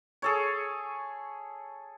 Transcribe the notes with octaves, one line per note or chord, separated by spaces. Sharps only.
G#4 A4 C#5